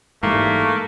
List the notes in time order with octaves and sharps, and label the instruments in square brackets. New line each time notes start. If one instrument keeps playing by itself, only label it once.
[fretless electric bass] G#2 E3 G3 [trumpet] A3 [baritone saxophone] A#3